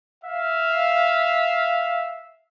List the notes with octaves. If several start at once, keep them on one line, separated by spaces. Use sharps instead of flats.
E5 F5